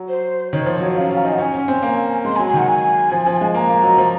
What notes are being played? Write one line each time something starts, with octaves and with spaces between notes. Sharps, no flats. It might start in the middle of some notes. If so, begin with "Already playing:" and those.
Already playing: F#3
C5
D#3 C#5
F3
F#3
C#4 F5
C#4
A#5
D#4 G#5
F#5
C#4 G#5
C#4
C4
A#3
G#3 C6
G#5
F#3
G#5
D#3 F#5
G#5
F3
F3
G#3
A#3 A#5
A#3
F#3
F3